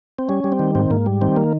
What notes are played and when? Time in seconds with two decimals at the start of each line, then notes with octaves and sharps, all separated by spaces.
0.19 C4
0.29 G3 C#4
0.44 G3
0.52 C4
0.59 D#3
0.75 G#2 C4
0.90 G#2 A#3
1.06 G3
1.21 D#3 C4
1.36 A#3